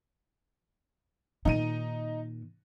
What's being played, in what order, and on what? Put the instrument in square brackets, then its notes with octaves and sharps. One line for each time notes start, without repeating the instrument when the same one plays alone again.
[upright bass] A#2 D#3 [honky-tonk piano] D#4 D#7